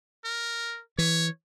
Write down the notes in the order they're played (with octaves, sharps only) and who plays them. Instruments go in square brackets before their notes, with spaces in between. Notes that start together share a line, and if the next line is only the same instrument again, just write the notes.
[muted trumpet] A#4
[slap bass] E3 [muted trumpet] C#5